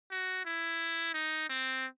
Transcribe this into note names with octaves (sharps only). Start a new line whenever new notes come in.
F#4
E4
D#4
C4